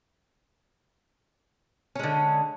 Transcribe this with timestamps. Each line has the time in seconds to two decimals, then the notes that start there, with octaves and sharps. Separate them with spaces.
1.95 C#4
1.99 G#3
2.03 D3